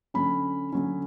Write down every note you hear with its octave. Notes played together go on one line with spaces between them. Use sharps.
D3 F#3 C#4 B5
D3 F#3 C#4